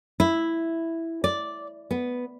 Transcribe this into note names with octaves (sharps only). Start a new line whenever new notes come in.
E4
D5
B3